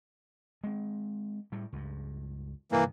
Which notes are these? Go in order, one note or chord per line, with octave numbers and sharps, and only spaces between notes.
G#3 C4
A2 G3
C#2 G2
G2 C3 D#3 E3 A#3